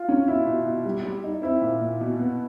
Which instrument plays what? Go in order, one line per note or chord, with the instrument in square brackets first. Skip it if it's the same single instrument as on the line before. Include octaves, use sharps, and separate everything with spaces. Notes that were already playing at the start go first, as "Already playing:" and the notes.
Already playing: [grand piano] F4
[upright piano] C#4
[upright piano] B2 [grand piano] E4
[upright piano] B2
B2
G3
G3
D#4
[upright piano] C4 [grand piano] E4
[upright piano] A#2
A#2
B2
B3